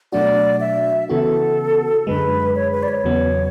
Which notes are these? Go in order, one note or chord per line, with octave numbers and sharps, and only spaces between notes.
B2 F#3 A3 D4 F#4 D5
E5
C#3 E3 B3 F#4 A4
F#2 D3 G#3 B4
C#5
B4
D5
C#5
E2 C#3 F#3 B3